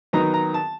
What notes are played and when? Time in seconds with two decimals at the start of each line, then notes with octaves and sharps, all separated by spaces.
0.13 D#3 F#3 B3 D#4 A#5
0.34 A#5
0.54 A5